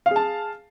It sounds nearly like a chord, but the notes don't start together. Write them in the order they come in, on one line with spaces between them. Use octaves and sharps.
F5 G#4 A5